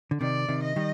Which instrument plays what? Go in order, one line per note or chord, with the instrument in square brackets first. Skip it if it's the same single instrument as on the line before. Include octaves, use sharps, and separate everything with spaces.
[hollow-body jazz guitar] D3
[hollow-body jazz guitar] C3 D#3 [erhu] D5
[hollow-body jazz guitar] C3 D#3
[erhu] D#5
[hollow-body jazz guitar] D#3 G3